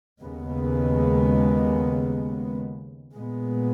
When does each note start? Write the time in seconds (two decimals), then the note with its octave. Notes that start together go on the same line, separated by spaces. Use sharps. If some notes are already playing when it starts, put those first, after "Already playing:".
0.22 D#2 C#3 G#3 B3
3.15 A#2 G#3 B3